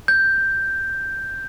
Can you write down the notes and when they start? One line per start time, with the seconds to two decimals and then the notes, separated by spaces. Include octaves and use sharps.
0.08 G6